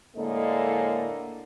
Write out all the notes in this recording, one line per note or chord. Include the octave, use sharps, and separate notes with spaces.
A2 D3 G#3 A#3 A4 D#5